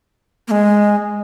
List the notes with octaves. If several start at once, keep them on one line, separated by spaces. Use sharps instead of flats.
A#3
G#3